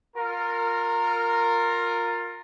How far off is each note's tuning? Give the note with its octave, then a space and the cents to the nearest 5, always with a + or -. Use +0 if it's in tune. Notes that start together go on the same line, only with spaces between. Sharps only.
F4 +20 A#4 -10